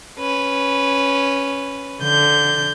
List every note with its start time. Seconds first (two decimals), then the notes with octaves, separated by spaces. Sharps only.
0.19 C#4 B4
2.02 D3 G6